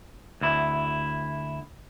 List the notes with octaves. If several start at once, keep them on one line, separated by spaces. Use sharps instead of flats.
D2 E4